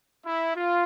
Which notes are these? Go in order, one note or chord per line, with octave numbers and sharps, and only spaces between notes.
E4
F4